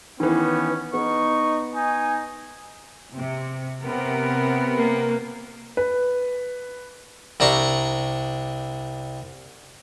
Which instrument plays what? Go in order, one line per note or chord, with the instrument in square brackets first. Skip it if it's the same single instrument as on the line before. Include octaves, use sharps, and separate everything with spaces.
[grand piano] D#3 E3 [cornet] B3 [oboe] C#4
[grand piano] B3 [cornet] D#4 [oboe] C#6
[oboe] D#4 [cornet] G#5
[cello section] C3
C3 B3 A#4
[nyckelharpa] A#3
[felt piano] B4
[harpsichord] C2 D4 A#5 C#6